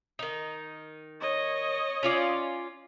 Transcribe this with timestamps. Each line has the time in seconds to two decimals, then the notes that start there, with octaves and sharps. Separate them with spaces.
0.19 D#3 D#4
1.20 C#5 D#5
2.03 C#4 F4 D5